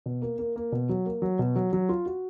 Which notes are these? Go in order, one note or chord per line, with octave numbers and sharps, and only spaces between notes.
B2
A#3
A#3
A#3
B2
F#3
A#3
F#3
B2
F#3
F#3
F4
F#4